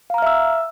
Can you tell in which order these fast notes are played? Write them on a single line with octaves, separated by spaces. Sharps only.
F5 A#5 F6 E5 E6